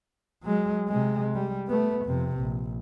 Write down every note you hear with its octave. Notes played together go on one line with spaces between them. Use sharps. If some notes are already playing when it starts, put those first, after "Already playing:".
F#3 G#3
C3 G#3
G3
A3 B3
F2 C3
A#1